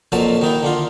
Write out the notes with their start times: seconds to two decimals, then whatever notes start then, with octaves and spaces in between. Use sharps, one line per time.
0.12 F2 A#2 F3 F#3 A5
0.42 D#3 D#4 E4
0.63 D3 D4 F4